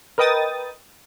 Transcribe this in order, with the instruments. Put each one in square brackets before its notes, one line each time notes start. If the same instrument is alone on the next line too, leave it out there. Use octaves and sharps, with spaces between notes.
[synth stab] A#4 B4 D#5 G5 D#6 A6